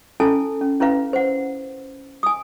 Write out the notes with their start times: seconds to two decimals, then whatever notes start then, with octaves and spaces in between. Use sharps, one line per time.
0.20 C#4 E4 A4 G#5 A5
0.61 C#4
0.80 C#4 E4 B4 F5
1.13 C5 F#5
2.23 G#5 D#6